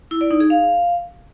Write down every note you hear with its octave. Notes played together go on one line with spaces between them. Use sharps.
E4
D5
D#4
G#4
F5